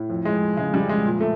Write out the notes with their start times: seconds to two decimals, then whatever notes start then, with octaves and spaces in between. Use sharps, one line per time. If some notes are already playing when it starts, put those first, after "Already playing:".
Already playing: A2
0.10 F2
0.25 G#3
0.33 F2
0.57 C#3 G#3
0.74 G3
0.81 F2
0.89 G#3
1.05 A#2
1.21 A3